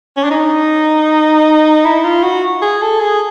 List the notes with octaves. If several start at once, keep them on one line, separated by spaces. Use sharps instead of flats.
C#4
D4
D#4
E4
F4
F#4
G#4
A4
G#4